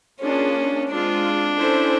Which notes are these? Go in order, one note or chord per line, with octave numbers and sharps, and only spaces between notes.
A#3 C#4 D4 F4 G#4
G#3 C4 D4 F4
C#4 E4 A4 C5